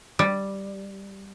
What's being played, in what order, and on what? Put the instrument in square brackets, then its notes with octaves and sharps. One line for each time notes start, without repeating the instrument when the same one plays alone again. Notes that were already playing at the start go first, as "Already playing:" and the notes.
[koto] G3